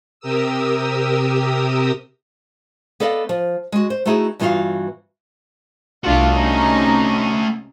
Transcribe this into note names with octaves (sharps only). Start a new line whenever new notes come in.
C3 G4 A#4 D#6 E6
B3 A4 D5 D#5 F5
F3
G#3 F#4
C5
A3 B3 D#4 E4 F#4 G#4
G2 E3 B3 F4 F#4 F5
C2 A3 D4 F4 F#4
C3 C#4 D#4